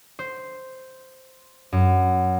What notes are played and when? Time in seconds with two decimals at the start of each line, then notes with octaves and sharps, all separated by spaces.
0.19 C5
1.72 F#2